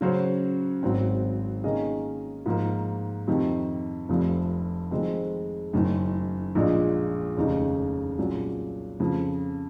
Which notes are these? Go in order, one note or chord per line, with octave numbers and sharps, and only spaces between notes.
C#3 F#3 C#4 F#4 C5
G#1 G#2 F#3 C4
D#3 A#3 C#4 G#4 D#5
G#2 F3 A#3
F2 C3 D#3
F1 F2 C3 F3
F2 D#3 G#3 C4
F#1 F#2 D#3
A#1 A#2 G#3
F1 D#2 C#3 G#3 D#4
C2 A#2 F#3 C#4 G#4
F2 C#3 F3